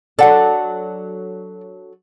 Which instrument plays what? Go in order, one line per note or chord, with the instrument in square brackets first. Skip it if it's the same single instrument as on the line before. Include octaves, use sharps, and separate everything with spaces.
[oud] F#3 D4 A4 [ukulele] D5 F#5